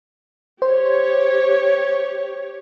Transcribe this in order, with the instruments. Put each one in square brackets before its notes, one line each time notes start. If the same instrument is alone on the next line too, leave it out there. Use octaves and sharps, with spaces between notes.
[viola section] G4 C#5 [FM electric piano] C5